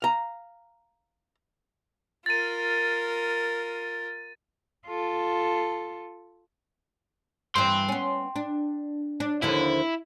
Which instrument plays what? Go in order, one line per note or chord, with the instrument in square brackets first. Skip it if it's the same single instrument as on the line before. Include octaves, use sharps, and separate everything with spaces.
[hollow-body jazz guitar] F5 A#5
[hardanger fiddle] F4 A#4 [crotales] A6 D#7
[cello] F4 A4
[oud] G2 E3 [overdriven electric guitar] G5 C6
[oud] B3 C#4
D4
D4
[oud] D#2 D3 F3 [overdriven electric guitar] E4